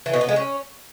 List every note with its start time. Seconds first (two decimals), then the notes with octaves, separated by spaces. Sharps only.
0.06 E3
0.13 B2
0.21 B3
0.29 G#3
0.36 C#4